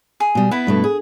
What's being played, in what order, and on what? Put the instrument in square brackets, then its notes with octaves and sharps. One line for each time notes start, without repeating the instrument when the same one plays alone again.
[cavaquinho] G#4
[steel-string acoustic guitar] B2 G3
[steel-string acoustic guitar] B3 [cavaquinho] E4 B4
[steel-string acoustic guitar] G2 B2 A3
G#4